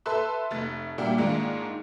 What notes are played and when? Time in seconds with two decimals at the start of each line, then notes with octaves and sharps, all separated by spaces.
0.06 A4 B4 E5 A5 C6 F#6
0.51 F1 A3 A6
0.98 A#2 G3 D4 F#4 E5 G5
1.18 G#2 D#3 G#3 A#3 D4 F4